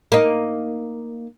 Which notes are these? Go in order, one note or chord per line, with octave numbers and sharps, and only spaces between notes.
A#3 D#4